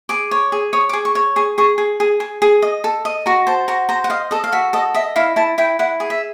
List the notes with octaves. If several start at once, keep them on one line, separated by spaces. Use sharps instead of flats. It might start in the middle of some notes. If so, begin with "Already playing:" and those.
G#4 D6
C#5
G#4
C#5 D#6
D6
G#4
C#6
C#5
G#4 C#6
G#4 C#6
G#4
G#4
G#4
G#4
D#5
A4
D#5
F#4 A#5
C5 A5
F#4 A#5
C5 A#5
F#5
D#5 F5
A4 D#5
F5
F#4 E5
A4 D#5
D#5 E5
E4 F5
E4 A5
E4 G5
E4 F#5
G#4
E5